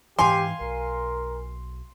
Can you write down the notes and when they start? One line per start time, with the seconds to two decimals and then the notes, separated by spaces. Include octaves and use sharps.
0.19 G#2 E3 G4 F5 G#5 C6
0.61 B1 A#4